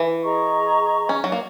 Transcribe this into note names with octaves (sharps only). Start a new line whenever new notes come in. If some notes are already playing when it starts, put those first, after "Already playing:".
Already playing: E3
G#4 D#5 A#5 C#6
C#4
F#3
A#3